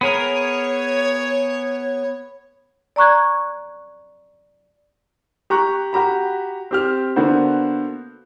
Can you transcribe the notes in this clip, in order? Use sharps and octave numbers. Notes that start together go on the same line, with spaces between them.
B3 G#4 A#4 C#5
D5 A#5 C#6 F#6 G#6
G4 A#5 C#6 F#6
F#4 G4 A#5 B5
C4 G4 F6
D3 A#3 B3 F#4 C5